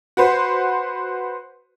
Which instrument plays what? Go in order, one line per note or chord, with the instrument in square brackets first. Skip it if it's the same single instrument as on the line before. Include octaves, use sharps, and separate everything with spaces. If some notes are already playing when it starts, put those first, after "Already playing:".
[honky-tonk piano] F#4 B4 C5